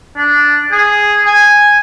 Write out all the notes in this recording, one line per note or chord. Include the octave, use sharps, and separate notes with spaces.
D4
G#4
G#5